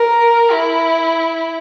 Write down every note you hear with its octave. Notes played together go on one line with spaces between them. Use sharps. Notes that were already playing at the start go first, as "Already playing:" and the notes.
Already playing: A#4
E4